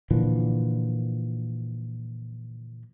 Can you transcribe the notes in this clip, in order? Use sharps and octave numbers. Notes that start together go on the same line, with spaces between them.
A#2 D3 E3 F3